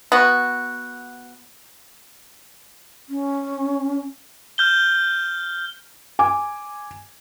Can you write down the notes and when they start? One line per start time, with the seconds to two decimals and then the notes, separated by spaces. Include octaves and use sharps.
0.12 B3 F#4
3.09 C#4
4.58 F6 G6 G7
6.19 G#5 D6